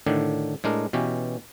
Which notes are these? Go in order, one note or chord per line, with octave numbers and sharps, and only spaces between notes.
A2 D3 D#3 D4
A2 G#3 D4 A#4
B2 E3 C#4 G4